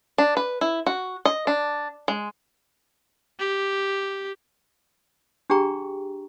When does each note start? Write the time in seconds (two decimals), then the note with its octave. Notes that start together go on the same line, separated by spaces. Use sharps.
0.18 D4
0.37 B4
0.61 E4
0.86 F#4
1.25 D#5
1.47 D4
2.08 G#3
3.39 G4
5.50 D4 G4 G#4 G5 A#5 C#6